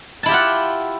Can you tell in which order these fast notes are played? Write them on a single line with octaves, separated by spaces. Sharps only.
A5 E4 G4 F4 F#5